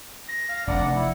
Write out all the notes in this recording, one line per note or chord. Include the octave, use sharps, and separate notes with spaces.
A#6
F5
F1 D4 D5 F#5
E4